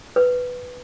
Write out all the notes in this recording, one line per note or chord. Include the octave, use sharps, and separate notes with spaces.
B4